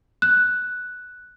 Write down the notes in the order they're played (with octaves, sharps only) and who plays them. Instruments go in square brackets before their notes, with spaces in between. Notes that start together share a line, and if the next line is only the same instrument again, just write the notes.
[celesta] F#6